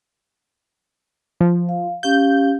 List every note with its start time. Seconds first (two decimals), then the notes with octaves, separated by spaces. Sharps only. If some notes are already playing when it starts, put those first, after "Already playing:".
1.41 F3
1.69 F5
2.03 C#4 G4 F5 G6